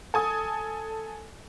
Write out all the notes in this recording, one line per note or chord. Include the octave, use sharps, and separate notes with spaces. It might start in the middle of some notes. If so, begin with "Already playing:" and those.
A4 G#5 D#6